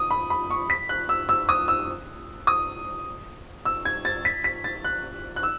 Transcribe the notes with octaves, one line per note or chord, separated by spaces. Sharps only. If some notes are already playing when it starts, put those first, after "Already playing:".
Already playing: D#6
B5
B5
C#6
B6
F#6
E6
E6
D#6
E6
D#6
E6
G#6
A6
B6
B6
A6
F#6
F#6
E6